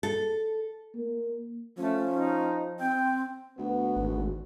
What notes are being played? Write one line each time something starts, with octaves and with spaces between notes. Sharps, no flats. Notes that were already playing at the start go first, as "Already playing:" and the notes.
A4
A#3
F3 A3 C#4
D#4
C4 G5
D2 B3 F#4
G#1